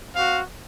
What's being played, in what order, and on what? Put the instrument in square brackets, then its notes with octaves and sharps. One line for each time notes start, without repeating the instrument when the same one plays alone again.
[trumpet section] C4 F#4 F5